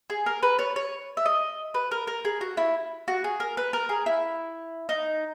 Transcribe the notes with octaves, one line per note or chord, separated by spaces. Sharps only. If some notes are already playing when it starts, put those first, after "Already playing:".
G#4
A#4
B4
C#5
C#5
E5
D#5
B4
A#4
A#4
G#4
F#4
E4
F#4
G#4
A#4
B4
A#4
G#4
E4
D#4